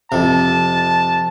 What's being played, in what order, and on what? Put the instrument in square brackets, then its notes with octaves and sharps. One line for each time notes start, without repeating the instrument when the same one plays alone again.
[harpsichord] F2 C3 [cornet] A5